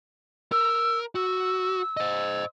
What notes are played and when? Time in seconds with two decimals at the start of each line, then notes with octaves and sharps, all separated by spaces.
0.52 A#4 E6
1.15 F#4 E6
1.97 C5 D#5